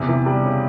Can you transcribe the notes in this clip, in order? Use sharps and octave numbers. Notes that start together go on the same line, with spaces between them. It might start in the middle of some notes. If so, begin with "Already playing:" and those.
Already playing: E2 C3
E3
G3
C#3